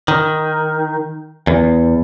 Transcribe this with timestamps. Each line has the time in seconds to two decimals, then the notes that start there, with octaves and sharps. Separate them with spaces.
0.08 D#3
1.47 E2